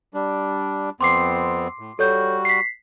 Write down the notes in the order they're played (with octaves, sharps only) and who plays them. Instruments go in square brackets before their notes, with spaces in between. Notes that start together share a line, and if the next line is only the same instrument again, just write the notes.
[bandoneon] G3 D4
[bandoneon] F2 B3 C4 [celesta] C6 D6 C7
[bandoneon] A2
[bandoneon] G3 F#4 [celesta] A4 C#5 G6
[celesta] B6 C7